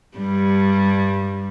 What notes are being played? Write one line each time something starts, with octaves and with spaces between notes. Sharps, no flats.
G2 G3